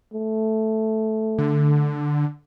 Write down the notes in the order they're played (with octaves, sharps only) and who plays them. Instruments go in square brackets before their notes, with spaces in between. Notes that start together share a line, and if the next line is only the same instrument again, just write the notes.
[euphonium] A3
[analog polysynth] D3